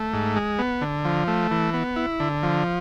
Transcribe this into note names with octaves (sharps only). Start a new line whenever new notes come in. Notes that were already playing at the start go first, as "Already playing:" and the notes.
Already playing: A3
G#2
G#3
B3
D3
F3
A3
E3
B3
E4
D3
F3